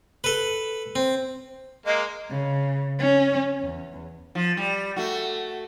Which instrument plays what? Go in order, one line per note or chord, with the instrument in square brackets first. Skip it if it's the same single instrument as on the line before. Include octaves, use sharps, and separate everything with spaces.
[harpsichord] A4 B4
C4
[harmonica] G#3 A#3 [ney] D#5
[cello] C#3
C#4
E2
[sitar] F3
G3
A3 F#4